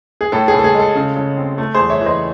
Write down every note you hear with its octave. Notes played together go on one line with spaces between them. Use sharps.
G#4
A2 A4
G#4
A2
A4
G#4
G#3 A4
C#3
C#3
C4
A3
G#4 C5
E2
C#5 E5
E3
C5 D#5